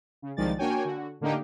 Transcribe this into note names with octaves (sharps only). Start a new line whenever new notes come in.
C#3
C2 D#3 F3 G#3 D5 A6
A#3 D4 F#4 C#5 G5 G#5
D3 F#4
A2 D3 A#3 D4 D#4 G4